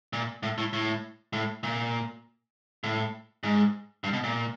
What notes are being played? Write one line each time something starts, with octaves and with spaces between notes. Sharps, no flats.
A#2
A2
A2
A2
A2
A#2
A2
G#2
G2
B2
A#2